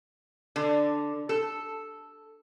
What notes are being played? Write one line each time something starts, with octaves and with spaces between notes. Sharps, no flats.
D3
A4